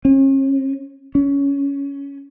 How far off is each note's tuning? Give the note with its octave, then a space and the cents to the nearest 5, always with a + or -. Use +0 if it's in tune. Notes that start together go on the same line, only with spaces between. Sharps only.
C#4 -40
C#4 +15